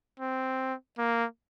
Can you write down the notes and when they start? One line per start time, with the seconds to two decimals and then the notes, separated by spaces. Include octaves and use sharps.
0.20 C4
0.98 A#3